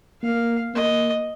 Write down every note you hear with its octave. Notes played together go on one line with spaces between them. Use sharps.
A#3 F5
A#3 D#5